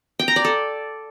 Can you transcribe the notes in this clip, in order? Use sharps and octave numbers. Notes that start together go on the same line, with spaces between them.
G5
A#5
D5
A4